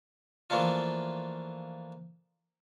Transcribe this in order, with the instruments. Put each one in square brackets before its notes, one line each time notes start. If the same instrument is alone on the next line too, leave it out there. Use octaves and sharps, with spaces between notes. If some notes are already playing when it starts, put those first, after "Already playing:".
[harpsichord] E3 F3 A3 A#3 D4 F4